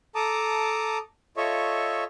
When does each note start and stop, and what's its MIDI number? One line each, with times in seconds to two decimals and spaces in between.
0.15 0.98 69
0.15 0.98 81
0.15 0.98 82
0.15 0.98 86
0.15 0.98 87
1.37 2.04 65
1.37 2.04 69
1.37 2.04 73
1.37 2.04 75
1.37 2.04 76
1.37 2.04 85